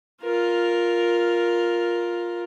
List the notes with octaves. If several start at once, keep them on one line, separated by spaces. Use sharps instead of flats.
F4 A#4